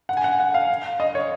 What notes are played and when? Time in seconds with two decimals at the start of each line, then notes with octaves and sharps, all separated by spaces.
0.09 F#5
0.17 G#5
0.24 F#5
0.40 F#5
0.54 F5
1.00 D#5
1.15 C#5